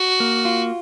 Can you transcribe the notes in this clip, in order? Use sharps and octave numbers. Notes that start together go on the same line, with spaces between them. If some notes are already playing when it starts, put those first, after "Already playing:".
Already playing: F#4
A#3
F4